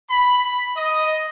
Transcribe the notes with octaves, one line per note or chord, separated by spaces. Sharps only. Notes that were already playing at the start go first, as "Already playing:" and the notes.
B5
D#5